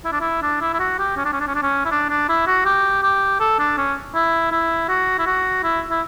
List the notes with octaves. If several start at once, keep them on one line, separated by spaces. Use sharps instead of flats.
E4
D4
E4
D4
E4
E4
F#4
G4
C#4
D4
C#4
D4
C#4
D4
C#4
E4
D4
D4
E4
F#4
G4
G4
A4
D4
C#4
E4
E4
F#4
E4
F#4
E4
E4